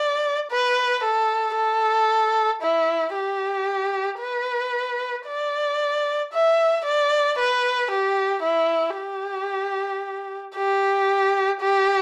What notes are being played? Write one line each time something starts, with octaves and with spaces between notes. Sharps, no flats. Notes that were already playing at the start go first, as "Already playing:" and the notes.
Already playing: D5
B4
A4
A4
E4
G4
B4
D5
E5
D5
B4
G4
E4
G4
G4
G4